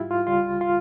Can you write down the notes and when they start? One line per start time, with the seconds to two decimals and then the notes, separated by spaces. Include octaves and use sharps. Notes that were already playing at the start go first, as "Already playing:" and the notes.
Already playing: G#2 G3 E4 F4 G4
0.11 F4
0.27 C#2 C#3 G3 F4
0.61 F4